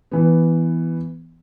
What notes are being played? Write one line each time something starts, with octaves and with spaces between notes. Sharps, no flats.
E3 B3